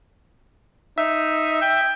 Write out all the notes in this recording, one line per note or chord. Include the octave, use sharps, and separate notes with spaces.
D#4 E5
G5